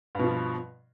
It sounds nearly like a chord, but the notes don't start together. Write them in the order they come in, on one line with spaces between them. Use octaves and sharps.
G2 B2 F3